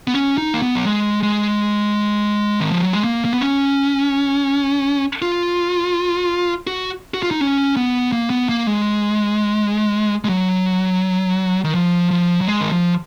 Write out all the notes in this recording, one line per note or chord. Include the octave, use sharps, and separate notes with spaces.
B3
C#4
D#4
A#3
B3
F#3
G#3
G#3
D#3
F3
F#3
G#3
A#3
A#3
B3
C#4
F4
F#4
F#4
F4
D#4
C#4
B3
A#3
B3
A#3
G#3
G#3
F#3
D#3
F3
F3
F#3
G#3
D#3
F3